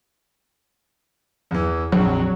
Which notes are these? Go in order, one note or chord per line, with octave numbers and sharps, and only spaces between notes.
E2 E3
A#1 F2 F#3